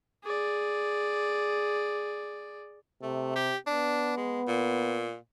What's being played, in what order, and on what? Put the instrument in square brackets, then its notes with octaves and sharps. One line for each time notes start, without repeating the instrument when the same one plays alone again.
[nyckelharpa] G#4 D5
[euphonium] C3 [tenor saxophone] A3
[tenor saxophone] G4
[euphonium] B3 [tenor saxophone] D4
[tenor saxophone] G#3
A#2